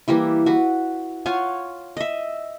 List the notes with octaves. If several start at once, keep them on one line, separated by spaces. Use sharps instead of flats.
E3 G3 A#3 E4
F#4 B4
F4 C#5 F#5 G#5
D#5 E5